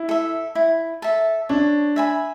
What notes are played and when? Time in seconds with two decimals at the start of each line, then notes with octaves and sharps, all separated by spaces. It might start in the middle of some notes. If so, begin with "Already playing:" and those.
Already playing: E4
0.09 A4 E5
0.55 E4
1.02 A4 E5
1.49 D4 C#5
1.96 E5 G#5 B5